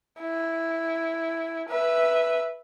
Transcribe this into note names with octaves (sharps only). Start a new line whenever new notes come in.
E4
B4 E5